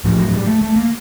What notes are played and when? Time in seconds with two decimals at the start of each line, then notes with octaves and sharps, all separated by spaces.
0.04 A2 F3
0.20 F#3
0.34 G3
0.47 A3
0.62 A3
0.76 A#3